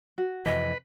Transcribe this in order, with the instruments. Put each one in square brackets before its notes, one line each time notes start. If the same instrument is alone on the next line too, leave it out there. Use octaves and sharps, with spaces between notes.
[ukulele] F#4
[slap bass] F2 C3 E3 [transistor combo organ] B4 [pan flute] D#5